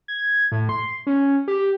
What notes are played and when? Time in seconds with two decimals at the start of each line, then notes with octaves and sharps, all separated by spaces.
0.08 G#6
0.52 A2
0.69 C6
1.07 C#4
1.48 G4